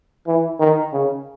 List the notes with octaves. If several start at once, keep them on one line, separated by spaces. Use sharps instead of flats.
E3
D#3
C#3